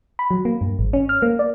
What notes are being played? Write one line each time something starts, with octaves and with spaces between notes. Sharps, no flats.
B5
F#3
A#3
G2
G#1
C#4
F6
A#3
D5